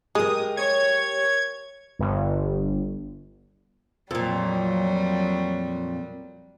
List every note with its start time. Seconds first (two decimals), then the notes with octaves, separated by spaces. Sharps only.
0.15 G#3 G4 A#4 D#6
0.57 C#5 G#6
1.99 G1
4.11 F2 A#2 F#3 G3